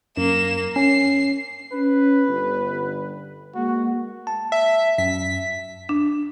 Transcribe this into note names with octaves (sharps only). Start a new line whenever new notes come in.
F#2 A#3 E7
C#4 C7
C#4 B4
G1
G#3 A#3 F#4
A5
E5
F#2 E5 B6
D4